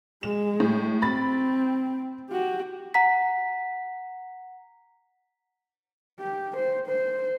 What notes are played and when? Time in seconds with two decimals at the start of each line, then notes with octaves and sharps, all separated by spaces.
0.23 G#3 E7
0.60 A2
1.02 C4 B5 A6
2.30 F#4 G4
2.94 F#5 A#5 B6
6.20 G4
6.57 C5
6.87 C5